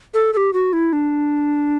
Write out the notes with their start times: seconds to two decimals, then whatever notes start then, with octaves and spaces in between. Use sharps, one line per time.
0.14 A4
0.33 A4
0.37 G4
0.53 F#4
0.73 E4
0.93 D4